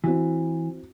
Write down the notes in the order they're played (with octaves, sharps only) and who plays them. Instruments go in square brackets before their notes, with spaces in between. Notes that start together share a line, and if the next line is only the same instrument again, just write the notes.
[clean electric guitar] E3 [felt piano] C4 E4 F#4